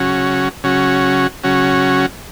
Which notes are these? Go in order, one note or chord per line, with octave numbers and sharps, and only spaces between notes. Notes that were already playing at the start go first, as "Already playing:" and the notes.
Already playing: C#3 F#3 C#4 F#4
C#3 F#3 C#4 F#4
C#3 F#3 C#4 F#4